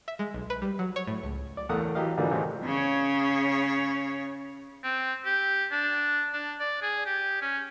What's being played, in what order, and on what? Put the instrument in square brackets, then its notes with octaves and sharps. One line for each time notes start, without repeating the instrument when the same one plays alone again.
[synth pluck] E5
G#3
B1
B4
G3
F#3
C#5
A2
C#2
[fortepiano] D5
E2 A2 A4 A#4 F#5 D#6
E3 F#3 G4 D#5 F5
G#2 D3 E3 F3 G3 A#3
G#1 A2 C3 E3 G#3 C4
[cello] C#3 C#5
[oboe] C4
G4
D4
D4
D5
G#4
G4
C#4